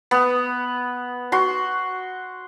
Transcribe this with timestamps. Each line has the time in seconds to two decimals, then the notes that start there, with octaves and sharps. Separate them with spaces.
0.11 B3
1.32 F#4 C6